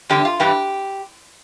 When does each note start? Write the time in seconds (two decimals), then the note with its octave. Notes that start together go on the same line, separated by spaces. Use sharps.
0.10 E2 D3 G3 G4
0.25 F4
0.40 G2 E3 G3 G4